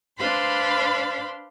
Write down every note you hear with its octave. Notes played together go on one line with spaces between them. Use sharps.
D4 B4 C5 F5 B5 C6